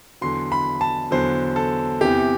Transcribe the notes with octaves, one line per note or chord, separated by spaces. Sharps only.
E2 D3 F#3 C6
B5
A5
E2 D3 F#3 C5
A4
E2 C3 E3 G4